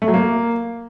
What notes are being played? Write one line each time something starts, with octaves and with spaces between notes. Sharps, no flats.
A3
F#3
A#3